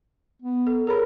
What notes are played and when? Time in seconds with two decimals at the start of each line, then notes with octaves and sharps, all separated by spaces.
0.42 B3
0.67 A4
0.87 G#4 A#4 C#5 B5